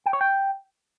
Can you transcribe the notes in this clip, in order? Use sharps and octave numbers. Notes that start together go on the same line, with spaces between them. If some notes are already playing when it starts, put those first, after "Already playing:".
G5
C#5
G5